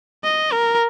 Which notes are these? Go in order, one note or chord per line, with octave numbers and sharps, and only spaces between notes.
D#5
A#4